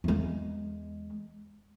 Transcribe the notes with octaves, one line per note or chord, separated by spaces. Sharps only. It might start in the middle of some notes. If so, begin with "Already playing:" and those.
E2 G#3